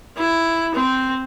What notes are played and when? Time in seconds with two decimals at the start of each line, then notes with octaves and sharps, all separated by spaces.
0.17 E4
0.75 C4